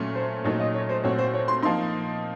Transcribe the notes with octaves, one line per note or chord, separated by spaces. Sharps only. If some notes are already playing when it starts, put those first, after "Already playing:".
Already playing: A#2 F#3 A3 C#4
C5
A#2 F#3 A3 D#4 C#5
D#5
C#5
C5
A#2 A3 C4 F#4 C#5
C5
C#5
C6
F3 A#3 D#4 C6